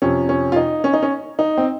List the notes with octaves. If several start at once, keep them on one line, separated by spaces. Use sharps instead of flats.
F2 C3 F3 C#4
C#4
F4
D#4
C#4
D#4
C#4
D#4
C4